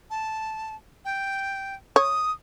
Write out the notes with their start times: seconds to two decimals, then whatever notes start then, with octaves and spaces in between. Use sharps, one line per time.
0.10 A5
1.05 G5
1.96 C#5 D#6